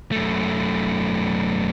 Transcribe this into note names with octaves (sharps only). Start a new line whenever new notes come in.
F#2 A3